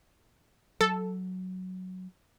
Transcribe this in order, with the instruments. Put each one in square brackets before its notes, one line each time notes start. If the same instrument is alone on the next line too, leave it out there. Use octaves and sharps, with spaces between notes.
[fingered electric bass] F#3 [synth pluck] A4